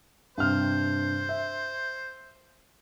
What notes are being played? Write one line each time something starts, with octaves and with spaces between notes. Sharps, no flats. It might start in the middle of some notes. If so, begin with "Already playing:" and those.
G2 C3 C5 F6
E5